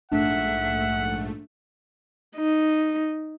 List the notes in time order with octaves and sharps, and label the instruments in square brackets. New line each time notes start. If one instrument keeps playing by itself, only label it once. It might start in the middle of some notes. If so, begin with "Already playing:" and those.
[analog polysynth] A#1 G#2 A3 [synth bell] D4 [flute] E5 [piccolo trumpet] F#5
[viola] D#4